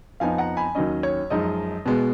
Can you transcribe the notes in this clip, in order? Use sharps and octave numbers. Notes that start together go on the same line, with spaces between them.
F2 F3 B3 D#4 F5 G#5
F#5 A#5
G#5 B5
D#2 D#3 F#3 C#4 D#5
C#5
F#2 F3 G#3 D#4 D#5
B2 G#3 B3